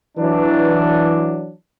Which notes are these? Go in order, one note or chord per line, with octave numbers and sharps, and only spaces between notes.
E3 F#3 D4